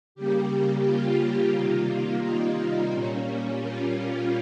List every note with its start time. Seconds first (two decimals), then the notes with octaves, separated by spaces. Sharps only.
0.15 C#3 G3 A#3 G4
0.85 F4
1.53 C3 D#3 G3 A#3
2.22 D#4
2.92 A#2 G3 A#3 C#4
3.26 C#4
3.61 F4